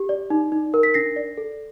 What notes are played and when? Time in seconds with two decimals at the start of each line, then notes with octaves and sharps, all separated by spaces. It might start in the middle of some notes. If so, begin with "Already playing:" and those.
Already playing: G4
0.09 D5
0.30 D#4
0.52 D#4
0.74 A#4
0.83 B6
0.94 D4 A#6 C7
1.16 D5
1.37 A4